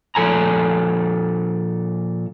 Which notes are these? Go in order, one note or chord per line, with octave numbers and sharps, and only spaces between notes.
A#2 F3 A4 G#5 A#5